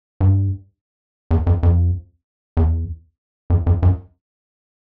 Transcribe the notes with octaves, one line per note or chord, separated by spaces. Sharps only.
G2
E2
F2
F2
E2
F2
F2
F#2